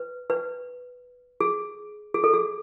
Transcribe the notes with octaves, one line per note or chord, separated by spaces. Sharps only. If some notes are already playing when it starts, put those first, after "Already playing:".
Already playing: B4
B4
G#4
G#4
A4
G#4